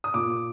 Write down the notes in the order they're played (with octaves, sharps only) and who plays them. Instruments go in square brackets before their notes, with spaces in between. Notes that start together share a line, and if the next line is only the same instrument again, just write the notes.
[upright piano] D#6
A#2 D6